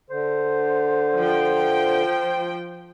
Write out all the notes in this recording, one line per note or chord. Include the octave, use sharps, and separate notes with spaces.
D3 C5
F3 G5